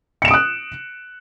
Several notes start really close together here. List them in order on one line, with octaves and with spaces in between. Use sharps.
C#7 E7 D7 D#6 F#6